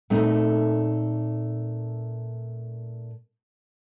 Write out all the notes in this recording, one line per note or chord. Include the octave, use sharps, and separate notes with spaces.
A#2 A3 C4 D#4